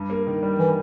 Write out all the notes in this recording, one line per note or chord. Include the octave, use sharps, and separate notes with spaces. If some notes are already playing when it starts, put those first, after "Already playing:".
Already playing: G2
A#3
D#3
G3
E3